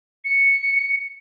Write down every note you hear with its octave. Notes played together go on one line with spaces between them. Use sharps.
C#7